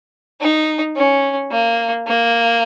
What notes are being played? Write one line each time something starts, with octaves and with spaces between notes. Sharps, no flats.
D#4
C#4
A#3
A#3